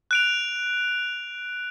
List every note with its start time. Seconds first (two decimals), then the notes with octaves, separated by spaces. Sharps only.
0.11 F#6 D7 F7